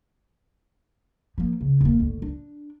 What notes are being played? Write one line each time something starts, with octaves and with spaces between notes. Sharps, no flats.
F3 A#3
C#3
D#1 A#3
G1 D2
D4